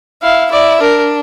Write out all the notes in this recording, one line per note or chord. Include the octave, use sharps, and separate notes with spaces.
E4 F5
E4 D5
D4 A#4